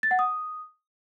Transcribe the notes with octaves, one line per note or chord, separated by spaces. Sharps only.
A6
F#5
D#6